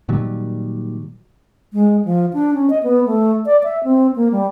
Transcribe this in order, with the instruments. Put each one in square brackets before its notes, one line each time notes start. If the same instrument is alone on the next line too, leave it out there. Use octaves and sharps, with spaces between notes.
[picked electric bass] A#2 D#3 F#3 G3
[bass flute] G#3
F3
D4
C#4
D#5
B3
A3
D5
E5
C4
A#3
G3